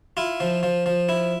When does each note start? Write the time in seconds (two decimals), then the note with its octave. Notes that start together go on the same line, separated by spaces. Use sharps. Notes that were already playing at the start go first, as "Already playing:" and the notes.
0.17 E4 F4
0.40 F3
0.63 F3
0.86 F3
1.09 E4